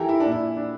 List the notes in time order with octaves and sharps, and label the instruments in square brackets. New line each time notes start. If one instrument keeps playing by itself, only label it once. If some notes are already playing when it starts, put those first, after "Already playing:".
Already playing: [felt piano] E3 [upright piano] G4 A4 A#4
[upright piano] E4
[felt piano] A#2 [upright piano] D4
[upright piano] E4
[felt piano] D4